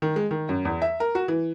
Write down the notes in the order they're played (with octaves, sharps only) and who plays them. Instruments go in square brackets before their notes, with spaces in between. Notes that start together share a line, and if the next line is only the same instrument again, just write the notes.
[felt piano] D#3
G#3
D#3
F#2
E2
E5
A#4
F#4
E3